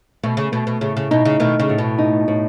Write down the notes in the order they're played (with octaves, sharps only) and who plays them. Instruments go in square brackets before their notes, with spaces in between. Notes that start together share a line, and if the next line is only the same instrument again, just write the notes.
[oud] B2 [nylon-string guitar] A3
[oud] C#3
[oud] B2 [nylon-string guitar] A3
[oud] B2
[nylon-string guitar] A2 [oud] C#3
[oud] C#3
[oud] B2 [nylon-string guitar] D#4
[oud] C#3
[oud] B2 D#3 [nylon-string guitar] A3
[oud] C#3
[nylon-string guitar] A2
[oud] B2
[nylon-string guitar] D#4
A2